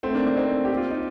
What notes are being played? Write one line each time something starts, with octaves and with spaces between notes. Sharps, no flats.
A3 C4
A#3 D4
A#3 D4
C4 D#4
G4
F4
D#4